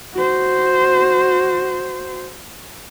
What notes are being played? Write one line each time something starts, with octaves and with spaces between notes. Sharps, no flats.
F#4 C5